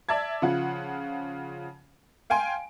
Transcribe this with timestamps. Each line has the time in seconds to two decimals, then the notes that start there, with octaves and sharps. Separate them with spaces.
0.09 D5 E5 A5 G#6
0.42 C#3 F3 F4 F#5
2.30 F5 G5 G#5 C6 D7